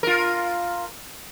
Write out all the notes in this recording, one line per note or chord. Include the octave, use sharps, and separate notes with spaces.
F4 A#4